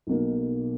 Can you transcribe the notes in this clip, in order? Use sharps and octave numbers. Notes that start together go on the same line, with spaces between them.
B1 B2 A#3